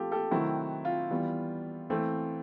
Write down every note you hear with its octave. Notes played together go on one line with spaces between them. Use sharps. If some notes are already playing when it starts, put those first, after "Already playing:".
Already playing: F3 A3 F4 G4 A4
G4 A4
C3 D#3 F#3 A3 C4 E4 F#4
F4
E3 G3 B3
E3 A3 C4